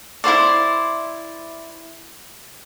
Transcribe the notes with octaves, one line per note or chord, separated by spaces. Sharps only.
E4 F4 C5 D5